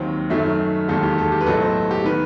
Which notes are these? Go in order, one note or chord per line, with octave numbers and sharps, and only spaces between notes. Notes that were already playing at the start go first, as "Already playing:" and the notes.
Already playing: D#2 D#3 F#3 C4 G5
F#2 D#3 F#3 A3 E5
E1 D#2 D#3 A4
G4
A4
G4
B4
B1 A2 F#3 B3 A4
C5
G4
D#3 B4